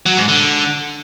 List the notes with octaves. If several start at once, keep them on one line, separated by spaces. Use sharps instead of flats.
F#3
G#2
D3